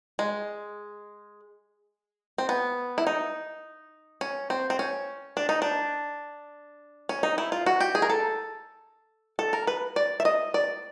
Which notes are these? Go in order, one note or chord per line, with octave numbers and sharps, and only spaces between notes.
G#3
C4
B3
E4
D#4
C#4
C4
C4
C#4
D4
D#4
D4
C#4
D#4
E4
F4
F#4
G4
G#4
A#4
A4
A4
A#4
B4
D5
E5
D#5
D5